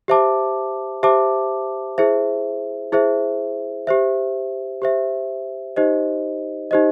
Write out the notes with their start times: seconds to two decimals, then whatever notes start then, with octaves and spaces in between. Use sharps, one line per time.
0.08 G4 C5 E5 A5 D6
1.03 G4 C5 E5 A5 D6
1.98 E4 G#4 C5 E5
2.92 E4 G#4 C5 E5
3.87 G4 C5 E5
4.82 G4 C5 E5
5.76 D#4 G4 C5 D#5
6.71 D#4 G4 C5 D#5